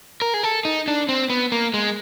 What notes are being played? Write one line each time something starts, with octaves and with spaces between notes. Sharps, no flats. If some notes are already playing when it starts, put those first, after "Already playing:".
A#4
G#4
A4
D#4
D4
C4
B3
A#3
G#3